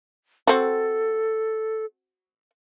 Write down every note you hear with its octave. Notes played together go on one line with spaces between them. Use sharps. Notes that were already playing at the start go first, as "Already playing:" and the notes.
C4 F#4 A4